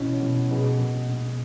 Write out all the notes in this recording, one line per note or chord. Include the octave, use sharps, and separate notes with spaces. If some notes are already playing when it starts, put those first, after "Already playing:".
Already playing: B2 E3 C#4
B2
B2 G#4 B4
B2
B2